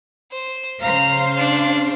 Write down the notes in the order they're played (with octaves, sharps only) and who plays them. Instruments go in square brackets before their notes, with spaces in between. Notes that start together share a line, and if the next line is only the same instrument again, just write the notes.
[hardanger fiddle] C5
[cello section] C#3 C5 F5 [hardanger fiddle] A#5
[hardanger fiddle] D4